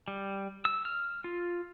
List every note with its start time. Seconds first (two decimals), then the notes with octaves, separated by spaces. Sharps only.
0.08 G3
0.65 E6
0.85 F6
1.24 F4